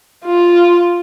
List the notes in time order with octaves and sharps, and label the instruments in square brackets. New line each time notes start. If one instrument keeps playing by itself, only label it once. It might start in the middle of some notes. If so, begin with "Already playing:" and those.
[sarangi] F4